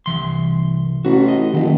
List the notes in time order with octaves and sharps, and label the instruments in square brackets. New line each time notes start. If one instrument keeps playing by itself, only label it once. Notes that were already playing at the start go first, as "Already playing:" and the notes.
[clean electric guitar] C2 E3 C6
[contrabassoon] A1 [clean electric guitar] F#4
[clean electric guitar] D#5
[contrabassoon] F#1 [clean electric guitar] D#3